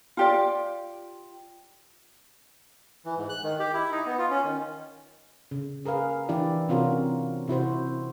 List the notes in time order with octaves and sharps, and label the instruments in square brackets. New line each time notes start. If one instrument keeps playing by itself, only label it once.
[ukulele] F4 G4 D5
[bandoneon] E3
G#2
F#6
D#3
G4
E4
D#4
B3
F4
C#4
D#3
[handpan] C#3
G#4 A#4 B4 F5
E3 D4 E4 G4 D5
C3 C4 C#4 F4 F#4 A#4
C3 E4 F#4 C5